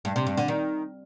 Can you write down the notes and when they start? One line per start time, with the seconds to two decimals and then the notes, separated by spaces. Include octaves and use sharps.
0.05 G2
0.16 C3
0.27 G2
0.37 D3
0.48 D#3